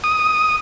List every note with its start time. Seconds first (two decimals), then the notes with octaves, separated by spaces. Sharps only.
0.04 D#6